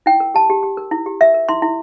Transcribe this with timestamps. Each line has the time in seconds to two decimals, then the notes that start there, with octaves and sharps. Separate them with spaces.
0.06 E4 G5
0.20 A#4
0.34 G4 A5
0.50 G4
0.63 G4
0.77 A#4
0.91 E4
1.06 G4
1.21 A#4 E5
1.34 A#4
1.49 E4 C6
1.62 E4